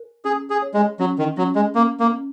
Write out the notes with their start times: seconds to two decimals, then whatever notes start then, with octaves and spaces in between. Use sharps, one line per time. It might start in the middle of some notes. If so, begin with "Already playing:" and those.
Already playing: A#4
0.25 C#4 G#4
0.50 G#4
0.62 C#5
0.74 G#3
1.00 F#3 C#4
1.19 D#3
1.37 F#3 C#4
1.55 G#3
1.75 A#3 C#4
2.00 A#3
2.12 C#4